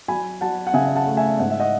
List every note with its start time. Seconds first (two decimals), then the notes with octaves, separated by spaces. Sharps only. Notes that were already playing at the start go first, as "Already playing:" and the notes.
0.08 F#3 G#5 B5
0.41 F#3 F#5 A5
0.67 F#5
0.74 C#3 E5 G#5
0.96 F#5 A5
1.06 A3
1.17 E5 G#5
1.39 G#2 F#5
1.50 E5
1.60 D#5 F#5